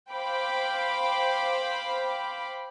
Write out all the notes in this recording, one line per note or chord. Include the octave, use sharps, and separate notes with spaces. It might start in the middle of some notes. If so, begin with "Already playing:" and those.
C5 F5 G5 B5 D6